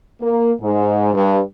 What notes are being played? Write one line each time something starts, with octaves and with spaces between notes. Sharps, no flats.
A#3
G#2
G2